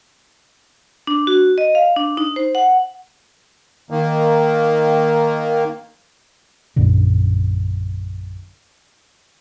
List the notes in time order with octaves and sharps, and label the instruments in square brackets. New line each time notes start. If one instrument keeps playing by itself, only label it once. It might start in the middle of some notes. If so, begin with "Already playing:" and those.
[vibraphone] D4
F#4
D#5
F5
D4
D#4
C5
F#5
[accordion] D#3 A#3
[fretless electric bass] A#1 F#2 A#2 D3